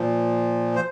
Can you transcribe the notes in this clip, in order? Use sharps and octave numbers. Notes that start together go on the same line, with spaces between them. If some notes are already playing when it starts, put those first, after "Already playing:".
Already playing: A#2 F3
C5